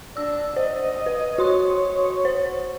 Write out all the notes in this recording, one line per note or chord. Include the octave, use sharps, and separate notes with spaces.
D4 E6
C5 D#5
B4
F#4 C#5 C6 D#6
C5